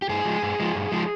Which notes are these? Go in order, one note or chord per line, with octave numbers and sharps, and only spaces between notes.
G4
G2 G#4
F3 G#3
G2
F3 G#3
G2
F3 G#3